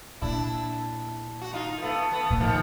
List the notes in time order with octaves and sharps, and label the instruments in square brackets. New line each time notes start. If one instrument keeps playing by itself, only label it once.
[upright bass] A#2 [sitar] D4 E4
[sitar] F#4
D#4 F4
A#3
A3 B3
A3 B3
[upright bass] A#2
[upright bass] A2 [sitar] D#3 F3